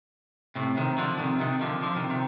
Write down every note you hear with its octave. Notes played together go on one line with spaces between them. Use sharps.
A2 C3
C3 D#3
D3 F3
C3 D#3
C3 D#3
D3 F3
D3 F3
C3 D#3
C3 D#3